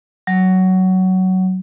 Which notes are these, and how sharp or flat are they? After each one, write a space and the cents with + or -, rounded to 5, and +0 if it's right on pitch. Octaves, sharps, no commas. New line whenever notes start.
F#3 +15